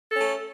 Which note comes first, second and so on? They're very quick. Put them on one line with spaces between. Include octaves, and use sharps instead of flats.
A4 C#4 A3